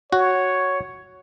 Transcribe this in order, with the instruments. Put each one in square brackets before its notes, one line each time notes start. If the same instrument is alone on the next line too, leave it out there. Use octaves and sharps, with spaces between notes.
[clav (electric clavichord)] F#4 [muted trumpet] C#5